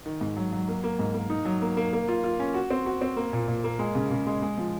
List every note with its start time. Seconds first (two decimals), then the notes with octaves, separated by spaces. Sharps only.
0.06 D#3
0.21 G#2
0.37 F#3
0.52 F#3
0.68 A#3
0.84 A#3
0.99 G#2
1.14 A#3
1.30 D#4
1.45 F#3
1.62 A#3
1.77 A#3
1.93 A#3
2.08 F4
2.24 F4
2.40 C#4
2.54 F#4
2.71 C4
2.86 F#4
3.02 C4
3.17 A#3
3.33 A#2
3.48 A#2
3.64 A#3
3.79 G#3
3.95 C#3
4.11 C#3
4.27 G#3
4.42 G#3
4.57 F3